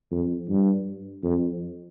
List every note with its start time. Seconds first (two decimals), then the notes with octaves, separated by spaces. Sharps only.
0.11 F2
0.49 G2
1.24 F2